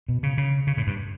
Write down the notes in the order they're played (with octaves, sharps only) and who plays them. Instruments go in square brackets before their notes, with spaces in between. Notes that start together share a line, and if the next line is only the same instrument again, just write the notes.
[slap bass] B2
C#3
C#3
C#3
A2
G2